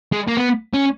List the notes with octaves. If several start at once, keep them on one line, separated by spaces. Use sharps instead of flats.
G#3
A#3
B3
C#4